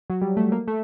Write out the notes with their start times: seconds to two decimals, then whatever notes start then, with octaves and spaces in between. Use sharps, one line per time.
0.10 F#3
0.22 G3
0.37 A3
0.52 A#3
0.68 A3